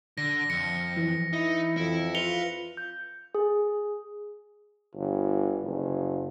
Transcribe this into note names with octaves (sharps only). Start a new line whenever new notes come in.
D3 A#6
F2 C#7
E3
D#4 E4
F2 E4
F4 B4 C#7 F7 G7
G6
G#4
G1
F#1